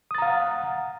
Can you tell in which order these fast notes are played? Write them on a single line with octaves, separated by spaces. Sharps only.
D#6 A6 A#5 F5 F#5